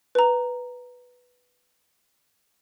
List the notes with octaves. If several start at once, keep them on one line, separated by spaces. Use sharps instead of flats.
B4 A#5